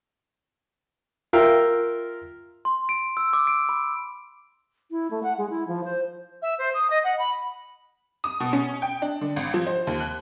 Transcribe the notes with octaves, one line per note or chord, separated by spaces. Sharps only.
F4 A#4 E5 F5 G5
C6
D7
E6
D6
D7
B5
E4
A3
F#5
G#3
E4
F3
C5
E5
C5
D#6
D#5
F#5
B5
D#6
B2
C#4
G5
D4
D3
G#1
F3
C5
D#2
F#6